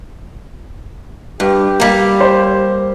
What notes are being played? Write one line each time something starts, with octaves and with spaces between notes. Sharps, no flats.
G2 G4
G3 A#3
C5